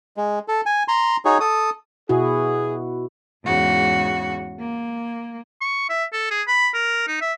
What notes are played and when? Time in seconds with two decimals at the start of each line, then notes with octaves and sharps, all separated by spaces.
0.17 G#3
0.48 A4
0.66 G#5
0.88 A#5 C6
1.25 D#4 F#4 G#4 C#5
1.40 A4 D#6
2.09 B2 E4 F#4 G#4
3.43 E2 G#2 C#3 F#4
4.59 A#3
5.61 C#6
5.90 E5
6.13 A4
6.30 G#4
6.47 B5
6.74 A#4
7.07 D#4
7.21 E5